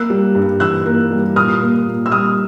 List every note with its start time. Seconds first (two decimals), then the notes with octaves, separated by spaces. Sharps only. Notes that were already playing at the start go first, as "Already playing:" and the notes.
Already playing: A#3 E6 F#6
0.10 G3
0.35 G2
0.60 E3 E6 F#6
0.86 A#3
1.11 G3
1.36 A#2 D#6 F6
1.61 A#3
1.86 A#2
2.06 E6
2.11 G3 D#6 F6